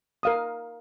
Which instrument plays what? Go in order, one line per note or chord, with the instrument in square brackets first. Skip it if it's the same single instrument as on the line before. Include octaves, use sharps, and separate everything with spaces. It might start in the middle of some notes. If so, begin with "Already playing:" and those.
[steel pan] A#4 F5 D#6